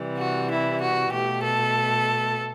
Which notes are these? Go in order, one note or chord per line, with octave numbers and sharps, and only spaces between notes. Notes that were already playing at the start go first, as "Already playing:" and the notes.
Already playing: C3 E3 G3
F#4
E4
F#4
B2 A3 G4
A4